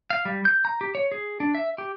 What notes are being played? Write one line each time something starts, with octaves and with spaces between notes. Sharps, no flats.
F5
G3
G6
A#5
G4
C#5
G#4
D4
E5
G4